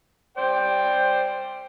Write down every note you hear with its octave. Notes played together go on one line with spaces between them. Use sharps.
C5 D5 G5